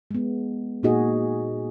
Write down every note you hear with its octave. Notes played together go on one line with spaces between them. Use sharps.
G#3 B3
A#2 A#3 D#4 F#4 G#4 D#5